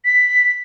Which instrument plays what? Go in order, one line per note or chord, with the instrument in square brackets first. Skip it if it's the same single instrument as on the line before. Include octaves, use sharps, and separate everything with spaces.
[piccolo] B6